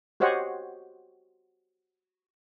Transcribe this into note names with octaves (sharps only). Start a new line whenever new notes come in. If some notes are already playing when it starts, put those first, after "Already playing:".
F#4 G4 C5 C#5 D#5 F#5